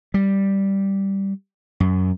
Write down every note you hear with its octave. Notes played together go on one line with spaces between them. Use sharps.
G3
F#2